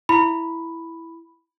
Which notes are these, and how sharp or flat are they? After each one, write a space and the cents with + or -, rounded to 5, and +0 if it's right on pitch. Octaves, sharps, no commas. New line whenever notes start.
E4 +0 B5 +0